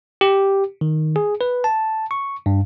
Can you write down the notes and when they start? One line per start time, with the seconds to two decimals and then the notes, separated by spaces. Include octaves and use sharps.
0.21 G4
0.81 D#3
1.16 G#4
1.41 B4
1.64 A5
2.11 C#6
2.46 G2